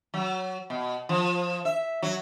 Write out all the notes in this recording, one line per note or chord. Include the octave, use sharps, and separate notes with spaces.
F#3
B2
F3
E5
F#3